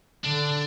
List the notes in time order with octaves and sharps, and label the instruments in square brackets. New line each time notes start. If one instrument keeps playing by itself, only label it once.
[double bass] D3 [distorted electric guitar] D4